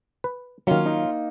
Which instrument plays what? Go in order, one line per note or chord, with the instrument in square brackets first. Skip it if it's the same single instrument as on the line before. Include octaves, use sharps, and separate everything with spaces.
[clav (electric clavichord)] B4
[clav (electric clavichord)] D#3 F#3 [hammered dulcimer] A#3 [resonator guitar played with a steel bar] C#4 F4
[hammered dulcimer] D#4